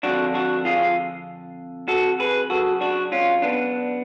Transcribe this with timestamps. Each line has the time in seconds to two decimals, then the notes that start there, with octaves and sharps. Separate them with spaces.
0.03 F2 D3 D4 F#4
0.34 D4 F#4
0.65 F4 G#4
1.88 F#4 A4
2.20 G#4 B4
2.50 F#2 C#3 F#4 A4
2.81 D4 F#4
3.12 C#4 F4
3.42 B3 D4